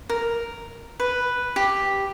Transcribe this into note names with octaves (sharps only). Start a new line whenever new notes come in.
A#4
B4
G4